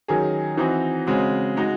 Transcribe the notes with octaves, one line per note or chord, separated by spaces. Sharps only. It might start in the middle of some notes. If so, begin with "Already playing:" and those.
D#3 F#3 C#4 G#4
E3 C4 D#4 F#4
C#3 G#3 C4 F#4
G#3 D#4 F#4